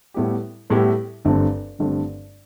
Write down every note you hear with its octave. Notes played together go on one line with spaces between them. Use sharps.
A2 G3 B3 E4 G4
A2 G3 B3 E4 G4
G1 G2 D3 A3 C4
G1 G2 D3 A3 C4